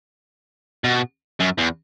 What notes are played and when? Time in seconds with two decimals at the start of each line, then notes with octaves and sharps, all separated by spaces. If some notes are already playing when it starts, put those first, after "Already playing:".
0.84 B2
1.40 F#2
1.58 E2